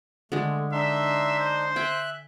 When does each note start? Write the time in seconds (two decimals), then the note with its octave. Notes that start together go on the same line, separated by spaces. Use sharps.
0.32 D3 G#3 A3
0.72 D4 D#4 E5 C6
1.39 C5
1.76 E5 G5 G#5 F#6